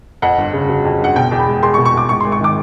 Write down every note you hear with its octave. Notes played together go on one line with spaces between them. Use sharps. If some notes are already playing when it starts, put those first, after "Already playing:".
F2 F#5
G1
C#3
F#3
F2
G1 F#5
B2 G5
E2
B5
G#3
E2 C6
C#6
B2
C#6
E2 D6
G#2 C#6
G#1 C6
C#6
D#3 D6